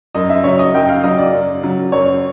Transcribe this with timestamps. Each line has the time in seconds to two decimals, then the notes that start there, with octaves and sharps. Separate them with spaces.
0.15 F#2 D#5
0.30 E5
0.44 C#3 F#3 C#5
0.59 D#5
0.74 F#2 G5
0.89 F5
1.04 C#3 F#3 D#5
1.18 D5
1.33 F#2
1.63 C#3 F#3
1.92 F#2 C#5